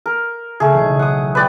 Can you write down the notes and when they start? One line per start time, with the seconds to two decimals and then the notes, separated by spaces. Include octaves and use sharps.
0.06 A#4
0.60 C#3 A3 G#4
0.73 B1 E3 F#3
0.99 F#5 D#6
1.35 B4 D5 G5